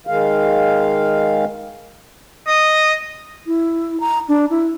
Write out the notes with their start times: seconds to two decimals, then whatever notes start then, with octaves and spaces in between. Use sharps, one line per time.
0.07 D#3 G#3 F5
2.47 D#5
3.47 E4
4.00 A#5
4.29 D4
4.50 E4